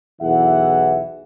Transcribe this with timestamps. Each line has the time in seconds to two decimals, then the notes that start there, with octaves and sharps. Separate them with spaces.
0.22 B1 E2 E3 E5 F#5